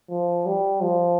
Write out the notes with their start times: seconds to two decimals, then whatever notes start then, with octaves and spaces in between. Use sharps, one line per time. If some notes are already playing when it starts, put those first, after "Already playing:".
0.10 F3
0.46 G3
0.81 F3